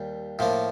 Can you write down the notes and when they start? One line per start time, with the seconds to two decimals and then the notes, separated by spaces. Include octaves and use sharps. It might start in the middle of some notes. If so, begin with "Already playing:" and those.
Already playing: D#2 G3
0.39 A2 F3 A#3